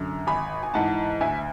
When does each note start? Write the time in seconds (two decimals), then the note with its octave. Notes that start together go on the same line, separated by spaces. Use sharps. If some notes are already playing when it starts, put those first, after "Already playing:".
Already playing: F#2 D3
0.27 G#1 G#5 B5
0.63 G#5
0.74 G#2 E3 F#5 A5
1.21 D2 E5 G#5